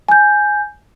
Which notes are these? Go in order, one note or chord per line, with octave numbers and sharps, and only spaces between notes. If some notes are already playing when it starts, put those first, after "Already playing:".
G#5 G6